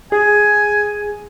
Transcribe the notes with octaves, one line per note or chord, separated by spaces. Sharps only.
G#4 G#5